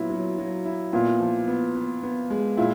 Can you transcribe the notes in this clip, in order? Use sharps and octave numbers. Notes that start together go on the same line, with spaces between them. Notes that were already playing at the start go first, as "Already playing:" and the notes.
Already playing: A#2 F#3 B3 E4
F#3
F#3
E4
A#2 B3
F3
B3
B3
B3
G#3
A#2 E4